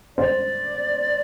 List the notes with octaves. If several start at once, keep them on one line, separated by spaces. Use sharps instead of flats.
C5 D5